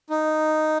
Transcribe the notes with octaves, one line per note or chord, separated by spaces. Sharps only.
D#4